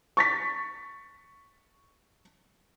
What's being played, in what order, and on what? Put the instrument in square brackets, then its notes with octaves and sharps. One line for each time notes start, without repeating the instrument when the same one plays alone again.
[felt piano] C#6 A6 B6